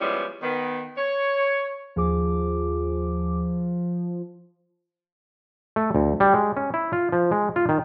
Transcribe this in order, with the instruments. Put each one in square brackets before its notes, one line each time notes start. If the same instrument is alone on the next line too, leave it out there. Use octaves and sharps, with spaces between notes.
[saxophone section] F3 G3 G#3 B3 C#4 E4
D#3 B3
C#5
[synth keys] D#2 G#4 D6 [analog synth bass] F3
[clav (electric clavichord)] A3
D2
G3
G#3
C#4
E4
F4
F3
G#3
F4
D#3